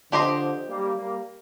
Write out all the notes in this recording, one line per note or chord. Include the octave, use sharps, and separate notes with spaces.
D3 F3 D4 G4 C5 D#5
G3 A#3
G3 A#3